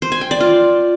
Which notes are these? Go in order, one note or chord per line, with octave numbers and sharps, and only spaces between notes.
C5
G#5
G5
D5
F4